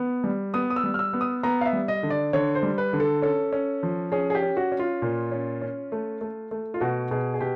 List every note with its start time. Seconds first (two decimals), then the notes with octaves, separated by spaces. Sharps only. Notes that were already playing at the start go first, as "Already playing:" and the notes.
Already playing: B3
0.24 G3
0.54 B3 D#6
0.70 D#6
0.76 E6
0.83 G3
0.94 F6
0.99 E6
1.13 B3
1.21 D#6
1.43 B3 A#5
1.61 F5
1.66 E5
1.73 G3
1.88 D#5
2.03 D3
2.10 D5
2.33 D3 C#5
2.55 C5
2.63 G3
2.78 B4
2.93 D3
3.00 A4
3.22 C#4 A4
3.53 C#4
3.83 F3
4.12 C#4 G#4
4.30 G#4
4.35 G4
4.42 C#4
4.57 F#4
4.72 C#4
4.79 F4
5.02 A#2
5.32 C#4
5.62 C#4
5.92 A3
6.21 A3
6.51 A3
6.74 F4
6.81 B2 F#4
7.11 B2 G#4
7.34 G#4
7.41 B2 G4